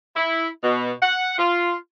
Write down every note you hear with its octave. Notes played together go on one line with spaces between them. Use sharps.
E4
B2
F#5
F4